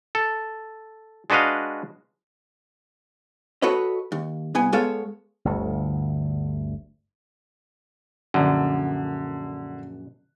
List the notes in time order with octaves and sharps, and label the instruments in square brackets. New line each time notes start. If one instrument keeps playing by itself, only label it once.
[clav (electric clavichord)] A4
G#3 D4 F#4 B4 D#5 F5
[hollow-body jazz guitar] F#4 A4 B4 C#5 D#5
D#2
C2 B3 G#5
G#3 B3 A4 C#5 F5
[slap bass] G1 D2
[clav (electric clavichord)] A#1 F#2 [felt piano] D3